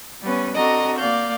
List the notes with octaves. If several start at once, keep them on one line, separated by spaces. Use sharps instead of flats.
G3 B3 C#4 B4
C4 D4 F#4 A4 D#5 A#5
A#3 D5 F5 G6